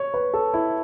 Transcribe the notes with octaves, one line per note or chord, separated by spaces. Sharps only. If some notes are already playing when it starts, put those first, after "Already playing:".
Already playing: C#5
B4
A4
E4